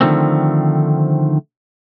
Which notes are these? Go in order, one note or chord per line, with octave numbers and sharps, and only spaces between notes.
D3 D#3 F3 A3 C4